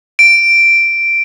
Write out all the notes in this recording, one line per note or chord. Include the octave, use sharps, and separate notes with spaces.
D7